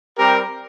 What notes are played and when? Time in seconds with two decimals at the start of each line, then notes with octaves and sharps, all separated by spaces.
0.17 G3 C4 G4 A#4